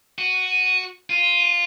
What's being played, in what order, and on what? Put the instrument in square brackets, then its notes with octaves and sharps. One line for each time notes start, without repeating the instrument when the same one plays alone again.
[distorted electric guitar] F#4 [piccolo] D#7
[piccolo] D#7
[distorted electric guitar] F4 [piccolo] D#7